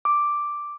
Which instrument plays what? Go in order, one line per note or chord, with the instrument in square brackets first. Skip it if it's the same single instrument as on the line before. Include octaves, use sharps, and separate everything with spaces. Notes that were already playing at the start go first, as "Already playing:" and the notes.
[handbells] D6